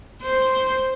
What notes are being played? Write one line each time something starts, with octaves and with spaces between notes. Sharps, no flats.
C5